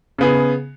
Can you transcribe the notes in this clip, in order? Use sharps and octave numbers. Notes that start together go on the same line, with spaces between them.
C#3 B3 G#4